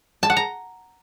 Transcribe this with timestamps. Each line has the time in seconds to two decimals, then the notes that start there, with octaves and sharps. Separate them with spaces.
0.23 A5
0.30 F#5
0.37 A#5